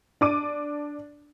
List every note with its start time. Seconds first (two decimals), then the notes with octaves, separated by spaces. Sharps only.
0.21 D4 D6 D#7